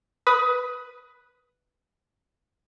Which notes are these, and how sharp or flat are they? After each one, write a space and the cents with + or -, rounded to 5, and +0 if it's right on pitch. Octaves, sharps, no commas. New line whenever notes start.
B4 +0 D#6 +20